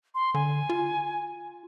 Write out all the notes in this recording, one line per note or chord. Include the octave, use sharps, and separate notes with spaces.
C6
D3 G#5
F4